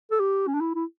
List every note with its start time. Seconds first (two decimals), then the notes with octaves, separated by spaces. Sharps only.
0.11 A4
0.20 G4
0.47 C#4
0.54 D4
0.61 E4
0.75 E4